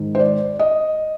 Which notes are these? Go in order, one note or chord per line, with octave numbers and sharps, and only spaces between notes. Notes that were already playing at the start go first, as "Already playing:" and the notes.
Already playing: G#2 D#3
C5
D5
D#5